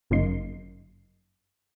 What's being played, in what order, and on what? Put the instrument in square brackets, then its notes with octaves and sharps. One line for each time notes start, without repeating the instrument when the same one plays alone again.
[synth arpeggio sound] G1 F#2 C#3 A#3 D#4 C6